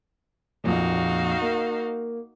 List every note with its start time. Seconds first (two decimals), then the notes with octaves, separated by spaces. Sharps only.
0.64 A#1 F2 A#2 D#4 F#4 F5
1.41 A#3